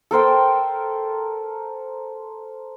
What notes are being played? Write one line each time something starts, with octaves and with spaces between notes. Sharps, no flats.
A4 A#4 C5 G5